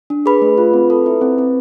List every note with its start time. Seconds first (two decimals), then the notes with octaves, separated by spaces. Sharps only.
0.10 D4
0.26 G#4 B4 B5
0.42 A3
0.58 F4
0.73 C4
0.90 A4
1.06 E4
1.21 C4
1.38 C4